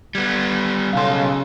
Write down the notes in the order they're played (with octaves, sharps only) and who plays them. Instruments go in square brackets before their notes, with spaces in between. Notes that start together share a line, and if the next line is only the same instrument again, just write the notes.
[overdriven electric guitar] G3 B3 [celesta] G#6
[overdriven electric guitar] B1 A4 [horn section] C#3 [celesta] F5 C6